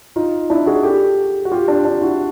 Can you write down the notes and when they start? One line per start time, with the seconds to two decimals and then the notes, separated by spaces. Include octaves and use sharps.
0.16 D#4 F4
0.50 D4 E4
0.66 F#4 G#4
0.83 G4 A4
1.45 F#4
1.52 F4 G4
1.68 D4
1.85 D4
2.01 E4 F#4